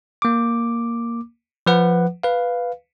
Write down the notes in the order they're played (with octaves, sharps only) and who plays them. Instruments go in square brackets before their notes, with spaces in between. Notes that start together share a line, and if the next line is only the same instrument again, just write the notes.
[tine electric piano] A#3 D6
F3 B4 F#5
B4 F5